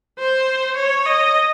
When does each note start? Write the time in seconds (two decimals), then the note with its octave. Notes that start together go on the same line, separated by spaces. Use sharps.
0.18 C5
0.76 C#5
1.06 D#5